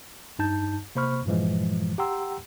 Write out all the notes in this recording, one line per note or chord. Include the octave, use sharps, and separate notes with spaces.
G2 D#4 A5 G6
C3 A#3 C5 B5 C#6 F6
G2 A#2 E3 F3 G#3
G4 F#5 G5 A#5 C6 E6